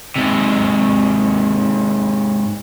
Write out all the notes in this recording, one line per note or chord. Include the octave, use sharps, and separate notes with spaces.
G#2 C3